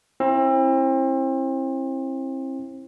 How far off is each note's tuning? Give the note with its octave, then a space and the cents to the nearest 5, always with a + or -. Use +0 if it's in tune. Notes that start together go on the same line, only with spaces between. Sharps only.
C4 +35 E4 +0